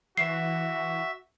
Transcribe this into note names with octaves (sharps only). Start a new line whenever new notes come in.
E3 F#4 E5 C7